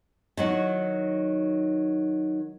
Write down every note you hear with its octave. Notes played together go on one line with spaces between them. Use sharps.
D#3 F#3 F#4